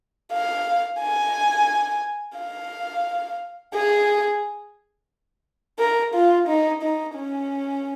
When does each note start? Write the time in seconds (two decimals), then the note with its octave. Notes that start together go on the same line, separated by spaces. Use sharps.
0.33 F5
1.01 G#5
2.38 F5
3.75 G#4
5.79 A#4
6.14 F4
6.48 D#4
6.82 D#4
7.16 C#4